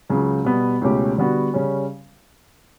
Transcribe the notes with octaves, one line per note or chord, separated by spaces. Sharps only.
C#2 C#3 F#3
B2 G3 B3
C#2 B2 A3 C#4 G4
D3 G3 B3 F#4
C#3 G3 C#4